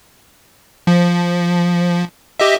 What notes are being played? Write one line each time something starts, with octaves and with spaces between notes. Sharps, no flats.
F3
G4 D#5 E5